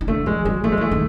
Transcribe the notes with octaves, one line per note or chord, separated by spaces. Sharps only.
D#3
D3 A3
F3 G#3
F#3 G#3
F3 A3
G#3
E3 A3
D#3